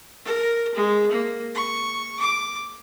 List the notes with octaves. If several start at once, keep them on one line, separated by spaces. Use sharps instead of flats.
A#4
G#3
A#3
C#6
D6